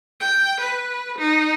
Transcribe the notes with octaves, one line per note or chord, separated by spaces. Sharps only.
G5
B4
D#4